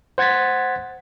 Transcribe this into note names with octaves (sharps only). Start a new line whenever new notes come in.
C5 F#5 G#6 A6 B6